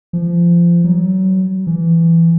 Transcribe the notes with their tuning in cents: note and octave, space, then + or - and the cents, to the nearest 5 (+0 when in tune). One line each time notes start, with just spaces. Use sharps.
F3 -25
F#3 +30
E3 +15